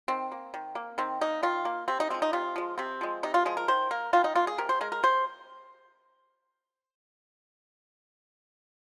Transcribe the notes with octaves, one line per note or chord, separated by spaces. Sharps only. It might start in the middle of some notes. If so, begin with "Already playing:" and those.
D#3 C4
A#3
D#3
A#3
D#3 C4
A#3 D#4
D#3 F4
A#3
C3 C4
D#4
F3 G#3 C4
D#4
C3 F4
F3 G#3
C3 C4
F3 G#3
C3 D#4
F4
F3 G#3 G#4
A#4
D#3 C5
A#3 A#4
D#3 F4
D#4
A#3 F4
G#4
C3 A#4
C5
G#3 A#4
A#4
C3 C5